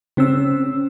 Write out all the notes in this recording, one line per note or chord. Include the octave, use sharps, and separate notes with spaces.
C#3 C4 C#4 E6